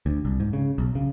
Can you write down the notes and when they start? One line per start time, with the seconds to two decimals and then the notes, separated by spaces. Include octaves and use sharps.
0.06 D2
0.25 C2
0.40 G#2
0.53 C#3
0.78 B1
0.95 C#3